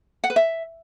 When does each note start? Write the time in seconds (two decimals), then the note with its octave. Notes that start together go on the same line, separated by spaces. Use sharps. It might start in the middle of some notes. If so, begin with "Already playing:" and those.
0.24 F#5
0.30 B4
0.36 E5